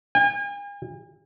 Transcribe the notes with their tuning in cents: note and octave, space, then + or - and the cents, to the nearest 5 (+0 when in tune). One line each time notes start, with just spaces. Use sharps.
G#5 -45